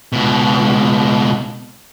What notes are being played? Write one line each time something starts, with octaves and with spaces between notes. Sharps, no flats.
C#2 B2